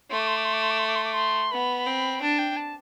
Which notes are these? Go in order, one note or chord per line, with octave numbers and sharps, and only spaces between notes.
A3 C6
D6
C6
D6
C6
D6
C6
D6
C6
D6
C6
D6
C6
B3 B5
C4
D4 A5
G5
A5